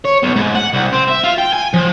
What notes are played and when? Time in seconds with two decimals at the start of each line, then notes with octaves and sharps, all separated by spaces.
0.05 C#5
0.23 B1
0.36 G#2
0.55 F#5
0.73 C2
0.93 C4
1.08 E5
1.24 F4
1.38 G5
1.53 G#5
1.74 F3